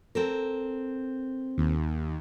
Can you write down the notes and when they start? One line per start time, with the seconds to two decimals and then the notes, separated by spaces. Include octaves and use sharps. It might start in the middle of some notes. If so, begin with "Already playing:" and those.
0.15 C4 A4 A#4
1.57 D#2